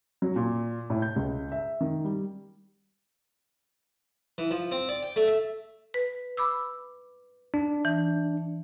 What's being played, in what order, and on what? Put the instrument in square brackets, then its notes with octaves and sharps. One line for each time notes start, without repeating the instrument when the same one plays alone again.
[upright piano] F#3
A#2
A2
G6
C#2
E5
D#3
G3
[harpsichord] E3
F3
C4
D5
G5
A3
E5
[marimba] B4
B5 D6 E6
[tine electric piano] D4
[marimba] E3